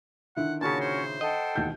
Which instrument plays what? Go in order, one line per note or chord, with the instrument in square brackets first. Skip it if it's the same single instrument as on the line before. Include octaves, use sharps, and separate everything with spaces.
[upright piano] D3 D#3 E4 [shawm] F#5
[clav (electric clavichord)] A#2 C#3 [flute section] C#4 F#4 C#5 [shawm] A5
[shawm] C5
[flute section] A4 F#5 G5 [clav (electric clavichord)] D#5
[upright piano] E1 D#2 G6